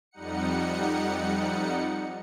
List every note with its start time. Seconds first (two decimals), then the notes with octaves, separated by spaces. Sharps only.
0.11 F2 G3 D#4 F#5 C#7